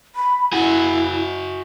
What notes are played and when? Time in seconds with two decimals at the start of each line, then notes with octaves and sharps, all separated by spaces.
0.15 B5
0.53 E4 F#4 G#4